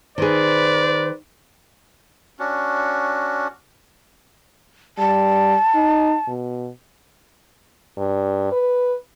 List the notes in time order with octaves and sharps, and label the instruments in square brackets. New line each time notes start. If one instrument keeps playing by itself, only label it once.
[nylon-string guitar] D#3 G#4 [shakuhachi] B4 [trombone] C5 [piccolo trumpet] D5
[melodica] C#4 D4 F#4
[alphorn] G3 [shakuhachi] A5
[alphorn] D#4
B2
G2
B4